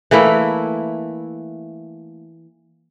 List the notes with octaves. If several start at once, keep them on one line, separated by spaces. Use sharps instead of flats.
E3 A3 A#3 E4